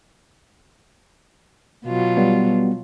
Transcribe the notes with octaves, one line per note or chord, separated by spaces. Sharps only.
B2 F#3 F4
G3 B3